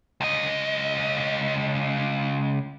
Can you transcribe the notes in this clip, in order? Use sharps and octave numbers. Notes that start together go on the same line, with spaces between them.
C#2 D#5